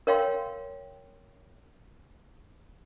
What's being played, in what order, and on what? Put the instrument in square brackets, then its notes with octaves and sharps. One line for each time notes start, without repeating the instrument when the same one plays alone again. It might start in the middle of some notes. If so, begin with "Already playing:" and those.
[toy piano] A#4 C#5 F5 G5 C6